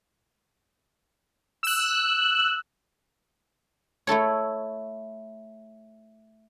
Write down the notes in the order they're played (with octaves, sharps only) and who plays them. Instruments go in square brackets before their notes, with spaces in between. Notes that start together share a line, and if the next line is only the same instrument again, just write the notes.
[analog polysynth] E6 F#6
[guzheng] A3 E4 A4 C#5